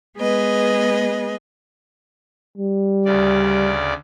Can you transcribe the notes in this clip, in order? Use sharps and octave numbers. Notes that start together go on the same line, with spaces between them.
G#3 B3 G#4 B4 D#5
G3
D2 C#3 D5